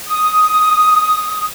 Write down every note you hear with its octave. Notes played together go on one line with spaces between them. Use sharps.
D#6